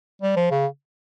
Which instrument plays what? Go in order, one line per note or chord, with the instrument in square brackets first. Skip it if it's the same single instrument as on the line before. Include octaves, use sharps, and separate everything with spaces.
[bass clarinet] G3
F3
C#3